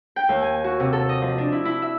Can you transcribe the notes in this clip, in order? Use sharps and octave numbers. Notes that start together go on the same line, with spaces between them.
G5
D#2
G#5
F#4
C3
A4
D#5
F3
D4
E4
E4
E5